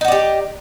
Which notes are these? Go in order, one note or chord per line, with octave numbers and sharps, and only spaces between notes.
D#4 F#4 G4 D5